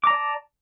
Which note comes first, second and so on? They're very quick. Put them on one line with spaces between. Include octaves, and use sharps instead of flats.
D6 A#5 D5 A5